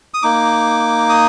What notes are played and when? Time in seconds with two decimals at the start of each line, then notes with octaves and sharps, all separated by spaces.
0.14 D#6
0.22 A#3 D#4 D6
1.09 D#6